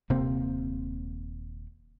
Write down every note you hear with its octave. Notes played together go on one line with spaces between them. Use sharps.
D#1 C3 A#3 C4